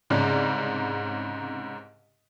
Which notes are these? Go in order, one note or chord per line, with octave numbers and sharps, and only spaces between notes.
C2 G#2 C#3 D5